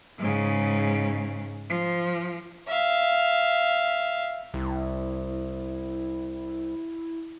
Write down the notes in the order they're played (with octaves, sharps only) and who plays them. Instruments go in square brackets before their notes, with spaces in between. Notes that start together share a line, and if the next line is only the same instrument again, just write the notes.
[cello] G#2 C#3
F3
[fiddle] E5 F5
[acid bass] C2 [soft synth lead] E4